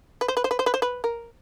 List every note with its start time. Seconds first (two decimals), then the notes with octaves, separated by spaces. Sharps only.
0.21 B4
0.28 C5
0.37 B4
0.44 C5
0.51 B4
0.59 C5
0.66 B4
0.74 C5
0.82 B4
1.04 A#4